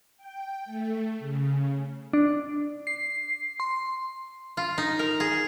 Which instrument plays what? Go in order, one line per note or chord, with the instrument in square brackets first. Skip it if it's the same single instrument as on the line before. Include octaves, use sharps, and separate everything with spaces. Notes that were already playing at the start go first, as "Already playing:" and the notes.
[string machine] G5
A3
C#3
[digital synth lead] D4
C7
C6
[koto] F4
D#4
A#4
G#4